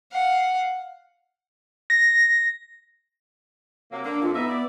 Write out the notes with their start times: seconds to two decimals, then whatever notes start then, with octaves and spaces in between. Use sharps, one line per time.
0.12 F5 F#5
1.90 A#6
3.92 C3 F#3 A#3
4.05 D3 A#3 D4
4.23 F2 F4
4.35 G#2 B3 D#4 E5
4.48 E4 D5